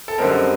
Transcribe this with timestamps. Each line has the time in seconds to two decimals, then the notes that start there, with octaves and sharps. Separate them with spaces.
0.08 A4
0.18 F#2 D3 G3 C4 D#4 A#4